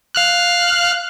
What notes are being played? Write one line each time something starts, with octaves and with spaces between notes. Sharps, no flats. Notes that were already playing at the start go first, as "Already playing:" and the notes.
F5 F6 F#6